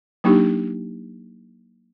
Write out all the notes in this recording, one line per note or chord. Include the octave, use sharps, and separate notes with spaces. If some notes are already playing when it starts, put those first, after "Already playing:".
F#3 A#3 D4 D#4 G4